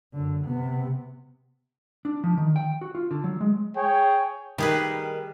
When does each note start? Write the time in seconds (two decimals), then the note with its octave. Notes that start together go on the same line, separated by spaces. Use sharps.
0.13 F#2 D3
0.45 C3 B3
2.05 D4
2.24 F3
2.38 D#3
2.56 G5
2.81 F#4
2.95 F4
3.11 D3
3.24 F#3
3.41 G#3
3.77 G#4 C#5 G5
4.58 D#3 G3 G#4 B4